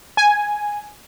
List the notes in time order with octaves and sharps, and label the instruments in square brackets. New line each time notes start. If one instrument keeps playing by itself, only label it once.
[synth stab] G#5